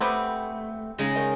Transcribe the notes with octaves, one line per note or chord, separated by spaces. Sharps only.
G3 A3 B3 C4
C#3 G#3 D#4
A#4 D#5